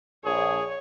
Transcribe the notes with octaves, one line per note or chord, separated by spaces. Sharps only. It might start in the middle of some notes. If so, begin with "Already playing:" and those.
A#1 G#4 C#5